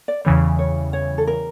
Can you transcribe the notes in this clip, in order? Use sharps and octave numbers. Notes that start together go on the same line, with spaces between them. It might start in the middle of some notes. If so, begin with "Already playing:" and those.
D5
E2 C#3 E3 G3 C#5
C#5
C#5
A4
A#4